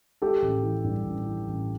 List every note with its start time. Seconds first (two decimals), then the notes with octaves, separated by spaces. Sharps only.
0.22 G#3 G4 A4
0.42 A1
0.63 E3
0.84 G2
1.04 A1
1.26 E3
1.47 A1